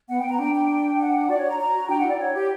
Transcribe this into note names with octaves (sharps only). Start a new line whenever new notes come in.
B3 F#5
G5
B3 A#5
D4 G5
G5
F#5
F#4 D5
C#5
A#5
A#5
F#4
D4 G5
F#5
E4 D5
C#5
G4